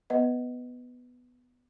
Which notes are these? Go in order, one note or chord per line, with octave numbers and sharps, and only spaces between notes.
B3 B4 D#5 F#5